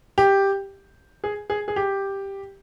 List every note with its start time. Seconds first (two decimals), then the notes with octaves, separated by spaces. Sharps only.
0.18 G4
1.24 G#4
1.50 G#4
1.68 G#4
1.76 G4